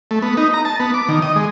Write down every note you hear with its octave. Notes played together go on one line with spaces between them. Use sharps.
A3
B3
D#4
A#5
A5
B3
D6
D#3
D#5
G#3